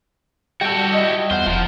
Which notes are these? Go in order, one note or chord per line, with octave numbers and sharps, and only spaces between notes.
G3 F#4 G4 A4 G5
D#4 E4
E2 C5 F#5 F6
E1 F3 A#5